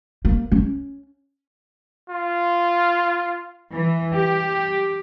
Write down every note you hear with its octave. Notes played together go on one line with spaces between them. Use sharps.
A#3
C#4
F4
E3
G4